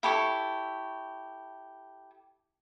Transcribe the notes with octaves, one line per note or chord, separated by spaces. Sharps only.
E4 G4 A4 C#6